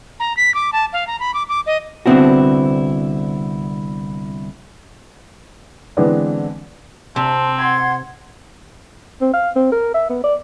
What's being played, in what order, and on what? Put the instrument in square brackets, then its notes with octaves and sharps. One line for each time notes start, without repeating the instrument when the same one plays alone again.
[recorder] A#5
B6
D6
A5
F5
A#5
B5
D6
D6
D#5
[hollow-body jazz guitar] C2 D3 B3 C4 E4 F#4
[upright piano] D3 E3 G#3 B3 C4 D4
[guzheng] C3 [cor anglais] C4 [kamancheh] A5
[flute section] F#5 G#6 [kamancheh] C6
[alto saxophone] C4
F5
C4
A#4
E5
B3
D5